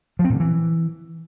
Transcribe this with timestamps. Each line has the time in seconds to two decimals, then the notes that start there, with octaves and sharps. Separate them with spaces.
0.19 F3
0.24 C4
0.30 A#2
0.35 D3
0.40 E3